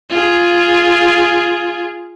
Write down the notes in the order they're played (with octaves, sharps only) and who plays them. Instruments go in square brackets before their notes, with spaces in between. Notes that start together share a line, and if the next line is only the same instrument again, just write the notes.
[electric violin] F4 G#4